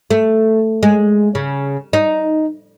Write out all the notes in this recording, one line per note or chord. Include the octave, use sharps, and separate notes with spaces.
A3
G#3
C#3
D#4